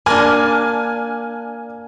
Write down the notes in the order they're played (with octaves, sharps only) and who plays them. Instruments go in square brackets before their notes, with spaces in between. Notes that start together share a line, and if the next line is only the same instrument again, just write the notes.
[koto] A#3 D4 [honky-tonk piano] G#5 F6